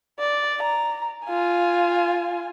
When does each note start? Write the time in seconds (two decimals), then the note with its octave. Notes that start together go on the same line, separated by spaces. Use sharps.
0.19 D5
0.63 A#5
1.26 F4 G#5